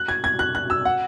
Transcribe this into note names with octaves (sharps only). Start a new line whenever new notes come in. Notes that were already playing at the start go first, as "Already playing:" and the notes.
Already playing: F#6
G#6
G#6
F#6
F#6
E6
F#5